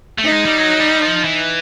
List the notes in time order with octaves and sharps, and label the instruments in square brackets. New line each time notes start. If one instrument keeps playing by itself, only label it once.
[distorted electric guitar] A3
[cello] D#4
[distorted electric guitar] G#3
G3
F#3
G3
F3
E3